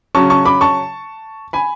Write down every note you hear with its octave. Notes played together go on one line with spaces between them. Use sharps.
C#3 F#3 C#4 A5 C#6
A5 C#6
B5 D6
A5 C#6
G#5 B5